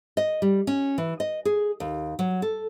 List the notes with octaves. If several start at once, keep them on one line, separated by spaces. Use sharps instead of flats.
D#5
G3
C#4
E3
D#5
G#4
D#2
F#3
A4